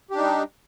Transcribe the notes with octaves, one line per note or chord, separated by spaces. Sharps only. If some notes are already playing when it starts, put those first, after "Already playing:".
G3 D4 D#4 G4